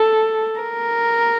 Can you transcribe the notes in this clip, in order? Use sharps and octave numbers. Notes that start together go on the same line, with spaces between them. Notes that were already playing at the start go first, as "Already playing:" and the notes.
Already playing: A4
A#4